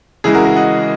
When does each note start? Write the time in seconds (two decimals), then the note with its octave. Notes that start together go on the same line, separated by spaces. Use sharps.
0.24 C#3 E3 G#3 E4 G#4
0.34 F#4 A#4
0.45 F#4 A#4
0.56 D#5 F#5